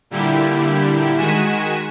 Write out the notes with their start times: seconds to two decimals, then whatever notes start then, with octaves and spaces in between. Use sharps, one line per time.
0.10 A#2 D3 G3 E4 G4
1.17 D#3 G#3 F#4 G#5 B6 E7